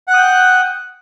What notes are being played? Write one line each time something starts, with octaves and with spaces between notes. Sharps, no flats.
F#5 G5 D#6 F#6